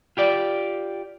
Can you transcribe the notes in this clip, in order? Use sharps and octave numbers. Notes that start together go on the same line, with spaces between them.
F4 G4 D5